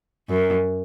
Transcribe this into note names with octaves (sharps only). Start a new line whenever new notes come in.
F#2